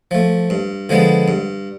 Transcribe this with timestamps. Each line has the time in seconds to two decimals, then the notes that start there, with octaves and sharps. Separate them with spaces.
0.11 F3 A3
0.50 G2
0.89 D3 F3 G#3 B3
1.28 G2